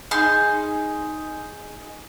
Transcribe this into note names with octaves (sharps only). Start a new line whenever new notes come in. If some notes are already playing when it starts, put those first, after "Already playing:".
D#4 G#4 C6